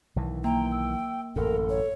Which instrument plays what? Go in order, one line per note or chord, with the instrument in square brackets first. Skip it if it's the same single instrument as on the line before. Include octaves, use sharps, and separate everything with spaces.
[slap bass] B1 D#3 E3
[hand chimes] A#3 [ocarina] G5 [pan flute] A#5
[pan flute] E6
[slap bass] A1 F#2 [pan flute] A4 [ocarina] A#4
[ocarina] C#5